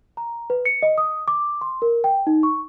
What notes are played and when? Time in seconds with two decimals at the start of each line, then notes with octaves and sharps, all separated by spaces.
0.17 A#5
0.50 B4
0.65 C#7
0.83 D#5
0.98 D#6
1.28 D6
1.61 C6
1.82 A#4
2.04 G5
2.27 D#4
2.43 C#6